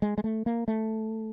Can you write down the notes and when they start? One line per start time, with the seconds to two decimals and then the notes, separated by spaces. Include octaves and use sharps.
0.02 G#3
0.18 G#3
0.24 A3
0.46 A#3
0.68 A3